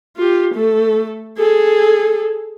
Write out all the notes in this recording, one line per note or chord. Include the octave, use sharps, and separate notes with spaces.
F4 G4
A3 A4
G#4 A4